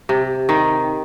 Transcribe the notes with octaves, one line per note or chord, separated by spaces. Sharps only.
C3
D#3